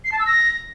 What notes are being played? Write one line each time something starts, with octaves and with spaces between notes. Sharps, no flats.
C7
A5
E6
A#6